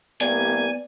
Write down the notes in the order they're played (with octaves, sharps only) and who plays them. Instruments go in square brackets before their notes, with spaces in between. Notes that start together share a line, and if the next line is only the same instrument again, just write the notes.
[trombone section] C2 A#3 G4 [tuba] B3 [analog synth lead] D5 [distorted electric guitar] G#5